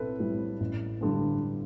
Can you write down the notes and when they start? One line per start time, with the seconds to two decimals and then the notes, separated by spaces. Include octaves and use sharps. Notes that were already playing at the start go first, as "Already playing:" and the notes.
Already playing: B1 A2 C4 A4 B4
0.20 A2 G3 C4
0.60 A1
1.01 G2 D3 G3